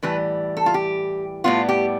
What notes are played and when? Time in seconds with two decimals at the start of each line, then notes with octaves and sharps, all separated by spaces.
0.03 A2 E3 G3 B4
0.57 A4
0.66 F4
0.74 G4
1.44 A2 G3 B3 F4
1.69 G4